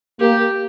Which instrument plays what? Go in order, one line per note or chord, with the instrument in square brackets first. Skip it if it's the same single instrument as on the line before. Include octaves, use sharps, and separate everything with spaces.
[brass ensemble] A#3 [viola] G4